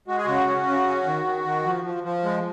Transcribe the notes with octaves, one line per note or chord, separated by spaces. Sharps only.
G#3 F#4
G#4
C#3 F#4
C#4
C#3
C#4
D#3
D#3
D#3
F3
F3
F3
G#3